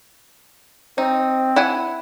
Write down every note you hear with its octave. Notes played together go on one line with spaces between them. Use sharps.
C4 D#4
E4 F#5 G#5